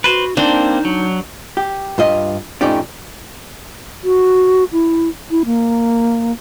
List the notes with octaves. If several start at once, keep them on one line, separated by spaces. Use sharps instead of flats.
F#4 B4 C5
A#3 C4 D4 D#4 C5
F#3
G4
G2 F4 D#5
F2 A2 C#4 D#4 G4 D5
F#4
E4
E4
A#3